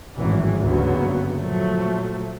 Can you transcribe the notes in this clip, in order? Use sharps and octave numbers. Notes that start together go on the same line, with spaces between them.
G#1 F#2 A2 E3
D2 G2 C#3 F#3 A#3 B3
A#2 F3 F#3 A3